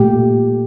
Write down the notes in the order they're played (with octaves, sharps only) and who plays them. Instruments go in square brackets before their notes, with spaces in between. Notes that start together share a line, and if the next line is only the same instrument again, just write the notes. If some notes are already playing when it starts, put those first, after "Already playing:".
Already playing: [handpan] A#2 A3 G4